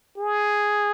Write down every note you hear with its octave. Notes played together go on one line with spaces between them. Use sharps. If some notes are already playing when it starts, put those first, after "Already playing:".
G#4